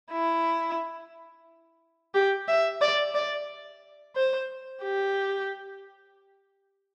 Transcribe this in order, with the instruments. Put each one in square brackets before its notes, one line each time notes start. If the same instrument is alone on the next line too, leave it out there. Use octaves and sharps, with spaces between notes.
[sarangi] E4
G4
E5
D5
D5
C5
G4